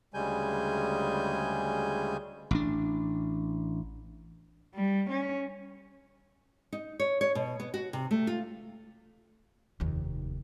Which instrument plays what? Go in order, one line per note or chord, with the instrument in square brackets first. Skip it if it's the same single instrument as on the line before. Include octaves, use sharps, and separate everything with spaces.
[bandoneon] D2 C#3 G3 G#3 G#5 G6
[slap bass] A1 D4
[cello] G3
C#4
[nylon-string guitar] D#4
C#5
C#5
B2
B3
F#4
C3
A3
F4
[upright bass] F1 D#2